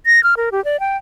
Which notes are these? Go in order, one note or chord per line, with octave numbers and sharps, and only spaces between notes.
A#6
F6
A#4
G4
D5
G5